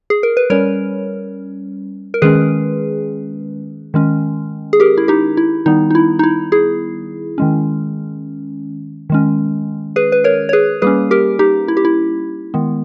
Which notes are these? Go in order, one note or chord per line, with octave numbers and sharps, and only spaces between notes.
G#4
A#4
B4
G3 C#4 A#4 C#5
A#4
D#3 G#3 C#4 G#4 B4
D#3 G#3 C#4
G#4
G4 A#4
E4
D#4 G4
E4
D#3 G3 B3 D#4
D#4
E4
D#4
E4
E4 G#4
D#3 G#3 C#4
D#3 G#3 C#4
G#4 B4
B4
A#4 C#5
C#5
G#4 B4
G3 A#3 C#4 G#4 B4
G4 A#4
D#4 G4
E4
G4
E4
D#3 G#3 B3